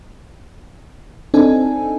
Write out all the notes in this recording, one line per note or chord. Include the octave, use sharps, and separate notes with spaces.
C4 D4 D#4 A4 G#5